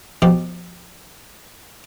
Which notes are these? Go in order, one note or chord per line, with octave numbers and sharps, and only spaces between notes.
B2 F3 G4